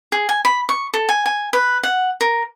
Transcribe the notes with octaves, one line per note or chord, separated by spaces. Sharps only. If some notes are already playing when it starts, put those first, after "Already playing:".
G#4
G#5
B5
C#6
A4
G#5
G#5
B4
F#5
A#4